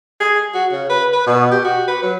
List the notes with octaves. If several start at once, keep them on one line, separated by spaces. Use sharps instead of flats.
G#4
F#4
C#3
B4
B4
B2
G4
F#4
B4
F#3